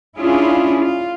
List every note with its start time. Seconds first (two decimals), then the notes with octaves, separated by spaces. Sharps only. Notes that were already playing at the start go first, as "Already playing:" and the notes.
0.18 C#4 D4 E4 F4 G#4
0.81 F4